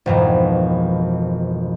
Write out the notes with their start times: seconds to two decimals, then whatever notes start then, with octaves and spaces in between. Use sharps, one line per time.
0.06 G#1 F2 B2 E3